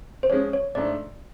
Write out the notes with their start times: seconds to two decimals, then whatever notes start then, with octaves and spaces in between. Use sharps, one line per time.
0.23 C5
0.30 F3 G#3 C#4 C#5
0.53 C#5
0.75 G#2 F3 A3 D4 D5